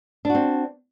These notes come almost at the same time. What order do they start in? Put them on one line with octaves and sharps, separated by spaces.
D4 F#4 C4